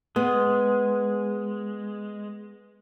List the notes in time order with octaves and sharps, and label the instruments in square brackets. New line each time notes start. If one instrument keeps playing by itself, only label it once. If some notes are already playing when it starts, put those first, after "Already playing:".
[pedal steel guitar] G#3 [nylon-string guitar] B3